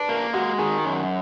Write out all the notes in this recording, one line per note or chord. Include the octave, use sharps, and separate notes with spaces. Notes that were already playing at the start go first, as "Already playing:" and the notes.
Already playing: D4 B4
A#3 A#4
G#3 F#4
D#3 G#4
F#2